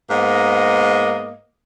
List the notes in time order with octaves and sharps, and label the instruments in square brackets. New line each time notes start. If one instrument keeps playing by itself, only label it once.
[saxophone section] G#2 A#3 B3 D#5